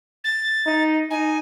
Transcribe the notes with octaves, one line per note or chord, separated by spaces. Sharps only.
A6
D#4
D#4 G#5